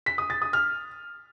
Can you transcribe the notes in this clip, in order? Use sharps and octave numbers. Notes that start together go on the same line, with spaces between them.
B6
D#6
A6
D#6
F6